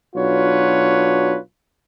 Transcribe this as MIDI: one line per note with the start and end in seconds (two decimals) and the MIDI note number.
0.16 1.38 35
0.16 1.38 62
0.16 1.38 65
0.16 1.38 66
0.16 1.38 71
0.16 1.38 73